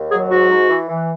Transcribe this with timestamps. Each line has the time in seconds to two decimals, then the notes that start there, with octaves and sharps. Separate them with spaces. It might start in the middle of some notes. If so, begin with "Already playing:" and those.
Already playing: D#2
0.11 F#3 G#4
0.31 G#2 F#4
0.50 G#2
0.69 E3
0.88 E3